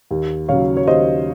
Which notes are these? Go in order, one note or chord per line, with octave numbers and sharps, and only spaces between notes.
D#2
C#3 F#3 C#5 F5
C#5
D#2 C5 D#5